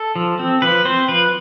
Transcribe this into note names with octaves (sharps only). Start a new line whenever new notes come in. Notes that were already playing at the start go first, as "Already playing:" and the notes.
Already playing: A4
F3
C4
F3 B4
C4 C5
F3 B4